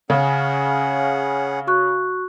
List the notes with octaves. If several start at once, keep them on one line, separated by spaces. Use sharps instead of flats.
C#3 C#4 G#4 F#5
F#4 C#6 F#6